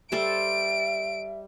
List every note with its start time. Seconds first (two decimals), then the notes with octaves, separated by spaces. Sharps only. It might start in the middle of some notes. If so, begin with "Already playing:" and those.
0.12 G3 A4 C5 E5 D7